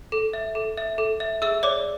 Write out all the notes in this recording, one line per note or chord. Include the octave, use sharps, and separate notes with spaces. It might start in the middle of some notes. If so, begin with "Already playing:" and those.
A4
E5
A4
E5
A4
E5
G#4 E5 E6
C#5 D5 D6